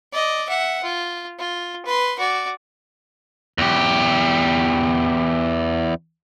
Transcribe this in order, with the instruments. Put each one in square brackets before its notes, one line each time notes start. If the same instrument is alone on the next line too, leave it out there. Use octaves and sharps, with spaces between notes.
[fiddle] D5 D#5
E5 F#5
F4
F4
B4 C6
F#4 D5
[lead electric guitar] E2 G4